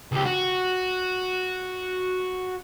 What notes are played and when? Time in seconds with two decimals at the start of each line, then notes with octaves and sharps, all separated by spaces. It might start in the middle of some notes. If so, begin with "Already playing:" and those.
0.12 C#2 G4
0.25 F#4